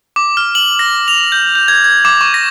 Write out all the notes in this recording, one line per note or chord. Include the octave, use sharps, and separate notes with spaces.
D6
F6
F#7
A#6
F7
G6
G6
G#6
G#6
D6
C#6
A#6